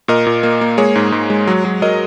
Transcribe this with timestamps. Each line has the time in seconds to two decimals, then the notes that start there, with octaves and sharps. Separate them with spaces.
0.08 A#2 A#4 D#5
0.26 A#2
0.43 A#3
0.61 A#3
0.78 G#3 G#4 C#5
0.95 G#2
1.12 G#2
1.30 G#3
1.47 F#3
1.65 F#3
1.82 F#3 A#4 D#5